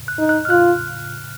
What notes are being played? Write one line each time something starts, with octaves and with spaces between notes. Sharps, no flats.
F#6
D#4
F#6
F6
F4 F#6